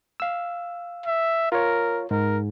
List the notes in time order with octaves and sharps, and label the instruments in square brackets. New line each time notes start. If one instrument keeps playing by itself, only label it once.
[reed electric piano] F5 E6
[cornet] E5
[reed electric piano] F4 C#5 [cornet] A#4
[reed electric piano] G#2 [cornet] A#4